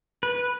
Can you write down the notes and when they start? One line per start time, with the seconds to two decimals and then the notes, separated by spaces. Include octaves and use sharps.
0.23 B4